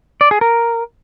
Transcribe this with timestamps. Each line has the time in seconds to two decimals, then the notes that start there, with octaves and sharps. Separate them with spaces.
0.21 D5
0.31 G#4
0.41 A#4